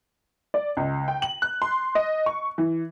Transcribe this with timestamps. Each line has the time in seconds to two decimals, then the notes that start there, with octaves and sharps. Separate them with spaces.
0.54 D5
0.77 C#2
1.08 G5
1.22 F#7
1.42 F#6
1.62 C6
1.95 D#5
2.26 C#6
2.58 E3